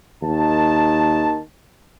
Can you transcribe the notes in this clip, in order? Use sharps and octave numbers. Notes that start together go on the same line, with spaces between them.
D#2 D#3 A5